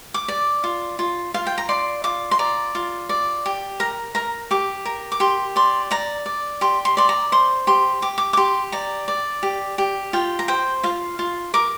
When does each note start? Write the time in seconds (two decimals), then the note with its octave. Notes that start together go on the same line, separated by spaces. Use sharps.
0.14 D6
0.28 D5
0.64 F4
0.99 F4
1.34 F4 F5
1.47 G5
1.58 A#5
1.69 D5 C6
2.04 F4 D6
2.31 C6
2.39 D5 A#5
2.75 F4
3.09 D5
3.46 G4
3.80 A#4 A#5
4.15 A#4 A#5
4.51 G4 D6
4.85 A#4
5.12 D6
5.20 G4 C6
5.56 D5 C6
5.91 D5 A#5
6.26 D5
6.61 G4 C6
6.85 C6
6.97 D5 C6
7.09 A#5
7.32 C5 C6
7.67 G4 C6
8.02 G4 D6
8.18 D6
8.33 D6
8.37 G4 C6
8.72 D5 A#5
9.08 D5
9.43 G4
9.78 G4
10.13 F4 G5
10.39 A#5
10.48 C5 G5
10.83 F4 F5
11.19 F4
11.54 A#4 D6